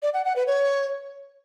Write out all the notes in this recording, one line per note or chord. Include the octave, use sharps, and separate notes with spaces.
D5
F#5
F#5
B4
C#5